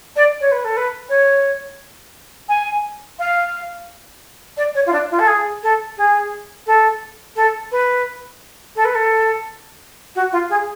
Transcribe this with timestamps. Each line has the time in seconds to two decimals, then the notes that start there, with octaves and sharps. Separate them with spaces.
0.16 D5
0.40 C#5
0.51 B4
0.64 A4
0.76 B4
1.09 C#5
2.48 G#5
3.19 F5
4.57 D5
4.74 C#5
4.86 F4
4.92 D4
5.10 F4
5.19 A4
5.27 G#4
5.62 A4
5.97 G#4
6.66 A4
7.35 A4
7.71 B4
8.75 A4
8.84 B4
8.94 A4
10.15 F#4
10.32 F4
10.49 G#4